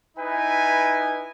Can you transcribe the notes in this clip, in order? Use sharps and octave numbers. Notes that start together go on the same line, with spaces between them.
D#4 E4 B4 G#5